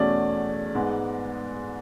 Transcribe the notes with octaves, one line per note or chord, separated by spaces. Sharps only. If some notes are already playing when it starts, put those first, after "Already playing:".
Already playing: E2 B2 A3 C#4 D5
G#2 G#3 B3